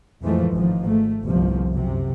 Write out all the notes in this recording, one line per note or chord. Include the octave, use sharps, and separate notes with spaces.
F2 G#2 E3 F3 G#3 A3
G#1 G#2 F3
A3
G1 C2 C3 F3
F#2 C3